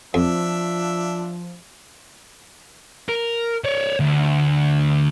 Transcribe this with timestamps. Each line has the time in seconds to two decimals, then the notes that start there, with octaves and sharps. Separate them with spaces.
0.14 F2 F3 D4 E5
3.08 A#4
3.64 C#5 D5
4.00 D2